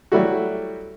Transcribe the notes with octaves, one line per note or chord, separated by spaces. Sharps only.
F#3 G3 A3 E4 F#4